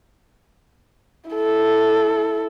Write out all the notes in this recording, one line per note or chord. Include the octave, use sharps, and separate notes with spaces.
E4 A4